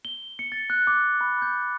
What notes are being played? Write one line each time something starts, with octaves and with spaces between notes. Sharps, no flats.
G7
C#7
A6
F#6
D6
B5
G6